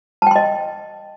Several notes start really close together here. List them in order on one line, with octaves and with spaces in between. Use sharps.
A5 G5 C6 D#5